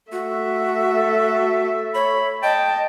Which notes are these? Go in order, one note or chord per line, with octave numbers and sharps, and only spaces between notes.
A3 F#4 E5
A4
C#5 B5
D#5 G5 A5